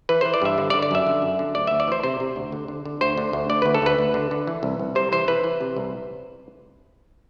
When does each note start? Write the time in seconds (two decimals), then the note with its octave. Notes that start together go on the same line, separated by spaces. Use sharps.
0.09 E3 B4
0.21 E3 C5
0.34 D5
0.42 G2 E5
0.58 D3
0.70 D5
0.74 D3
0.82 D5
0.91 F#2 E5
1.07 D3
1.22 F#2
1.39 D3
1.55 D2 D5
1.67 D2 E5
1.80 D5
1.88 E3 C5
2.03 C3 C5
2.20 C3
2.36 D2
2.52 D3
2.68 D3
2.85 D3
3.01 D2 C5
3.18 D3
3.33 D2
3.49 D3 D5
3.62 D2 B4
3.74 A4
3.82 D2 B4
3.99 D2
4.14 D3
4.31 D3
4.47 E3
4.63 C2
4.79 C2
4.95 C3 C5
5.12 E3 C5
5.28 E3 B4
5.44 E3
5.61 C3
5.76 C2